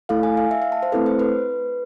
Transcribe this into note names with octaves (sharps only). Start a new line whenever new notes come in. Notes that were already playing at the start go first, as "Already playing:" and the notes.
A3 E4 A4 F5
G#5
F5
E5
F5
A5
C5
A3 C4 E4 A4 B4
C5
B4